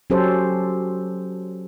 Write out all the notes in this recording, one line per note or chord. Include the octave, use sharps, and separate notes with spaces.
F#3 C#4 G4 A4 C5